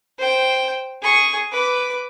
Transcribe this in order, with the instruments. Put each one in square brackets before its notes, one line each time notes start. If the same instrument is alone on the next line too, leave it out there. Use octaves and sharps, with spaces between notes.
[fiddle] C5 G5
G#4 C#6
B4 D6